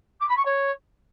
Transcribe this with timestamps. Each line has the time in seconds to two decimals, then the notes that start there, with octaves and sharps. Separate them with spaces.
0.20 D6
0.28 B5
0.37 C#6
0.45 C#5